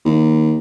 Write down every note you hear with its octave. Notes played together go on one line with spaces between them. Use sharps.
D#2